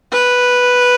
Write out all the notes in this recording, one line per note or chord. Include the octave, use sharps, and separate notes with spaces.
B4